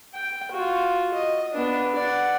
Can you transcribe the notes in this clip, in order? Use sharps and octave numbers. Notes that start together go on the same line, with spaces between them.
G5
F4 F#4
D#5
B3 D4
D5 F#5